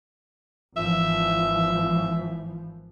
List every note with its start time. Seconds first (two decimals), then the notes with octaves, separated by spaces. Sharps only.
0.77 G#1 E3 F3 E5